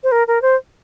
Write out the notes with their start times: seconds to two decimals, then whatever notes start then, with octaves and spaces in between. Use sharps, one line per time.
0.03 C5
0.12 A#4
0.27 A#4
0.42 C5